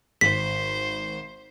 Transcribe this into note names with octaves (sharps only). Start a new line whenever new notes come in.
G#1 C5 B6